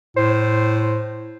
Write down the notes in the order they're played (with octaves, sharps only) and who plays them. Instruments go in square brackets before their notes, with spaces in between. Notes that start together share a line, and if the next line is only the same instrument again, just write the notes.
[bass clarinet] A2 [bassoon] C5